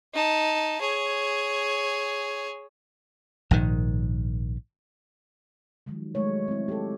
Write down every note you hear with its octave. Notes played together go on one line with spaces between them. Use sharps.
D#4 A5
G#4 C#5
A#1 G#2 D#3
D#3 F3 F#3 G#3
F#3 G#3 A3 C#5
C4 E4
G4 A4